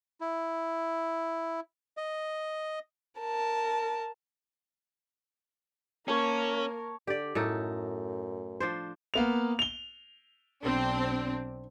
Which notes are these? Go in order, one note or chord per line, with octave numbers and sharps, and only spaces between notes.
E4
D#5
A#4 A5
A#3 C#4 A#4 C#5 A5
D3 G4 D5
F#2 A2 D#4 A4
F3 D4 C5
A#3 B3 F7
F7 G7
B1 C4 D4